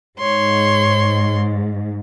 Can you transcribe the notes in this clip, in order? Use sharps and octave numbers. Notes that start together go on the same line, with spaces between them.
G#2 C#5 C6